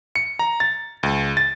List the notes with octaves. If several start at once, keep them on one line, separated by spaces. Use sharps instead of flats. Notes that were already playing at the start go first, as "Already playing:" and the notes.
C#7
A#5
A6
C#2
A6